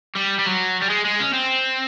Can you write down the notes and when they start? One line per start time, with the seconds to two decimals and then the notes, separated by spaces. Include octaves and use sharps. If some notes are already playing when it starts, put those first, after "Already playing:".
0.16 G3
0.39 G3
0.46 F#3
0.82 G3
0.90 G#3
1.05 G#3
1.19 C#4
1.33 C4